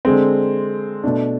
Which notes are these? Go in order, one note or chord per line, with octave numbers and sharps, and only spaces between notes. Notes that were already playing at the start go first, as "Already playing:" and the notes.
D3 G#3 C4
B2 A3 D4